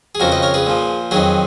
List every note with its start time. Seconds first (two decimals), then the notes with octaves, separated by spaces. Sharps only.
0.15 G#4
0.20 F2 C#3 F3 F#4 A#4
0.32 B4 D#5
0.43 A#4 C#5
0.54 G#4 B4
0.66 A#2 F3
1.11 F2 D#3 F#3 G#4 B4